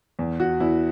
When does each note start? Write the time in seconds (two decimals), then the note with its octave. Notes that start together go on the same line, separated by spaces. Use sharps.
0.19 E2
0.40 F#4
0.60 E2 E4